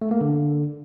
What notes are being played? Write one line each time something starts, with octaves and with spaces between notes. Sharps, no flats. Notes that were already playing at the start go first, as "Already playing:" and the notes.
A3
A#3
D3